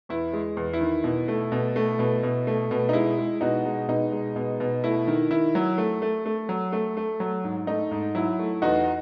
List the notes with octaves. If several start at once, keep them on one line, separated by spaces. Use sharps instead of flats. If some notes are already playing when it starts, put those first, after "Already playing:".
E2 E4
G#3
E2
E4
D#3
B2
A3
B2
A3
B2
B2
A3
B2
D#4
G#3 E4
G#3
B2 D#4 F#4
G#3
B2 D#4
G#3
B2
B2
A3 E4
D#3
D#3 E4
F#3
A3
A3
A3
F#3
A3
A3
F#3
G#2
A3 D#4
G#2
F#3 E4
A3
E2 D#4 F#4